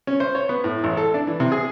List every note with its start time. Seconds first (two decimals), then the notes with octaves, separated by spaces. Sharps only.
0.07 C#4
0.20 C5
0.35 C#5
0.49 B3
0.64 A2
0.84 A1
0.97 A4
1.14 D4
1.27 E3
1.40 C3
1.52 G#4